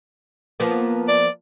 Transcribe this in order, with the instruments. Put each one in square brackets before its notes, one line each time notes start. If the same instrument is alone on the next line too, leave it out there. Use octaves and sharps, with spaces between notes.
[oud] F3 A#3 B3
[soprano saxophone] D5